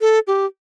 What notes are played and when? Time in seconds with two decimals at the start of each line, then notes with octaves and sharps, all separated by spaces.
0.01 A4
0.27 G4